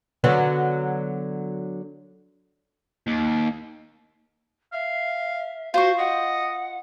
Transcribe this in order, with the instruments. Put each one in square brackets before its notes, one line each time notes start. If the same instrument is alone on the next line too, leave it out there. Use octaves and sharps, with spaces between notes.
[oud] D3 F#3 B3
[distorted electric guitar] D#2
[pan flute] E5 [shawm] F5
[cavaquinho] F4 C#6 [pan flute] F#4 [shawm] C5
[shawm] D#5 [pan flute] F#5